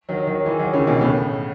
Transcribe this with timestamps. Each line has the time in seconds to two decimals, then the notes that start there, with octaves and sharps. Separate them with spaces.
0.09 D#3 F#3
0.27 D#3 F#3
0.45 E3 G#3
0.59 D#3 F#3
0.73 C#3 E3
0.87 B2 D#3
1.01 A2 C#3